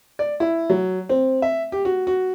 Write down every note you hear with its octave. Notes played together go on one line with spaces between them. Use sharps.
D5
E4
F#3
C4
E5
G4
F#4
F#4